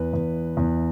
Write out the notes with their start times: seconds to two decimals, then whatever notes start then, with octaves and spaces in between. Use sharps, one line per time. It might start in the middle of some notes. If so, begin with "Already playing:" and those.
Already playing: E2 B4
0.13 E2
0.57 E2